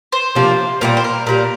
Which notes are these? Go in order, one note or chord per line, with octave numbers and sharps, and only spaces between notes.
C5
C3 F3 A#3 D4
A#2 G3 A#3 A#4
C5
A#4
A#2 G3 A#3 A#4